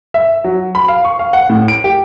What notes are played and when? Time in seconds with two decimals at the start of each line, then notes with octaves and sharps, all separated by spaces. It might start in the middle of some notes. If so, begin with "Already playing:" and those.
0.14 E5
0.44 F#3
0.75 B5
0.88 F5
1.04 C#6
1.19 F5
1.33 F#5
1.49 A2
1.68 D7
1.84 G4